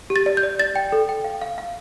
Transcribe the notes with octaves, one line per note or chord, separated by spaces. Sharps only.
G4
A6
D5
G6
D5
D5 A6
G5
A4
G5
F5
F5
F5